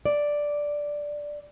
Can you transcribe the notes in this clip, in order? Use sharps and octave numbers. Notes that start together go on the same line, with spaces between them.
D5